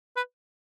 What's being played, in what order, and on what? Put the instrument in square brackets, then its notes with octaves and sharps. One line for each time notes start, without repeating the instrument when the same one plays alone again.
[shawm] B4